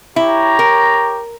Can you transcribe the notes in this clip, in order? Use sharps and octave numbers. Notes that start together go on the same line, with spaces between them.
E4 G4 C#5 A#5
A#4